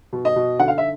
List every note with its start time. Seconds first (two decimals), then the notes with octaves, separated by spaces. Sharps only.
0.13 B2
0.25 D#5
0.36 B2
0.59 D3 F#5
0.68 F5
0.78 E5